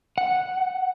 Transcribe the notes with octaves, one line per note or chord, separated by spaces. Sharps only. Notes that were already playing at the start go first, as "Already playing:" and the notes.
F#5